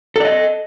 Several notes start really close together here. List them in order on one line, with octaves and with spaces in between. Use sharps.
A4 D5 D#5